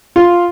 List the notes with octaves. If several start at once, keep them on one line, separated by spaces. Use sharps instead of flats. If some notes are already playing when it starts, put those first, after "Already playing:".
F4